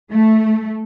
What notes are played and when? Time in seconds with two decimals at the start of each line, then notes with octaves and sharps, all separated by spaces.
0.12 A3